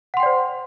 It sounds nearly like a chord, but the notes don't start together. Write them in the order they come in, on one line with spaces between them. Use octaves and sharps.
F#5 C6 G5 D5 C5